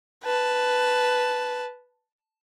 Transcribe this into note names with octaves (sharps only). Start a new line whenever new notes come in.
B4 A5